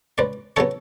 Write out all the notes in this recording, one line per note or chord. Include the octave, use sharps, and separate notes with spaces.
C#2 B4 D5
C#3 F#3 B3 A4 C#5